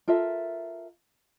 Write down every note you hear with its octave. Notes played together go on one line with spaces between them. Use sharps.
F4 A4 A#4 E5